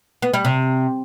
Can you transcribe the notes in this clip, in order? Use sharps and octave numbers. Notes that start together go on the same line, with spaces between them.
B3
G3
C3